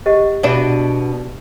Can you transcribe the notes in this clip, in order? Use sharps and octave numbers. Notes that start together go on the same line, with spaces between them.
G4 D#5 F#5
B2 D4 E5 D6